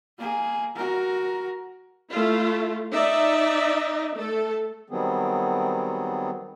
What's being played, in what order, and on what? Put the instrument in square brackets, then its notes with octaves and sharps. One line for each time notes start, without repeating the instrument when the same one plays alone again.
[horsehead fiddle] A#3 G#4
F#4 A#4
[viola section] A3 E4 F4
D#4 D5 E5
A3 A4
[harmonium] D#3 F#3 G3 B3 C4 G#4